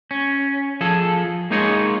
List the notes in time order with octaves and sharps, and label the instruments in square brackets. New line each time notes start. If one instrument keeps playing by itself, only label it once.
[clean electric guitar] C#4
F3 G#4 A4
G#3 A#3 D#4 F4 G#4 C#5